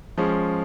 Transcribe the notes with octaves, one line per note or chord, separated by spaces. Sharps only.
F3 G#3 C#4